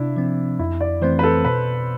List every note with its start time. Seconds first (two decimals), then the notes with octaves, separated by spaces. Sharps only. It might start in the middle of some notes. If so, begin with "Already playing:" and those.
Already playing: C3 D4 E4
0.16 F3 C4
0.59 F2 E4
0.81 D5
1.02 E3 A3 C4 C5
1.19 B4
1.23 A4
1.45 B2 B4